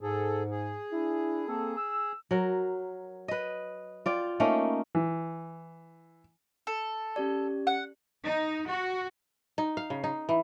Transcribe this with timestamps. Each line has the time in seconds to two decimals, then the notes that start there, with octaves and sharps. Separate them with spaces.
0.01 G#2 G#4 A4
0.51 G#4
0.92 D4 E4
1.47 A#3 C4 A4
1.77 E6
2.31 F#3 A#4
3.28 B4 D#5
4.06 F4 D5 G5
4.40 A3 A#3 C#4 D#4
4.95 E3
6.67 A4
7.16 C#4 G4 D5
7.67 F#5
8.22 D#4
8.66 F#4
9.58 D#4
9.77 F5
9.90 C#3
10.04 D#4
10.29 E3